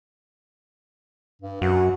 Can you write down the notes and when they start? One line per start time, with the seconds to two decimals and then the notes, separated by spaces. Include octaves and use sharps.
1.42 G2
1.62 F#2 F#4